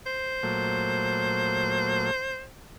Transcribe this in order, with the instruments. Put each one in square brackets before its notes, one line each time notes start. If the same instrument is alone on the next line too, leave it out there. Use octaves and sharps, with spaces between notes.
[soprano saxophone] C5
[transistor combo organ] A#2 F#3 A3